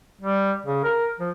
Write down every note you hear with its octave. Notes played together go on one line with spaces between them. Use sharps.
G3
C#3
A#4
F3